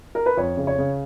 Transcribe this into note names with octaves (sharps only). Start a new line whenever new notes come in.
A#4
B4
F2 C#5
C#3
C#5
C#3